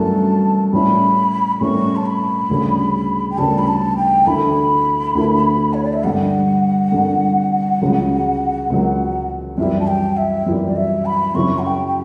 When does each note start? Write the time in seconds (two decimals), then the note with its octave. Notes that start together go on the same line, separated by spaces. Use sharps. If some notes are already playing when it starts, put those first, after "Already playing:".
Already playing: G2 F#3 A3 C#4 E4 A5
0.73 A2 G3 C#4 E4 B5
1.61 A2 G3 C#4 E4 C#6
1.96 A5
2.06 B5
2.49 D2 C#3 G3
3.30 G5
3.38 D2 C#3 G3 A5
3.58 B5
3.68 A5
3.97 G5
4.26 D2 D3 A3 E4 B5
5.15 D2 D3 A3 E4
5.74 C#5
5.84 D5
5.93 E5
6.04 G2 D3 G3 F#5
6.92 G2 D3 G3
7.81 C#2 C#3 F#3
8.70 C#2 C#3 F#3
9.58 F#2 E3 G3 E5
9.80 A5
9.87 G5
10.17 E5
10.46 F#2 E3 G3
10.67 D5
10.76 E5
11.05 B5
11.34 F#2 C#3 F#3 C#4 E4 C#6
11.58 F#5
11.65 G5
11.87 G5